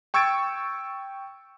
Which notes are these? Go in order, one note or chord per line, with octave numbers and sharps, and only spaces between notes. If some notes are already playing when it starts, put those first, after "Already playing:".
G5 C#6 E6 G#6 A6 D7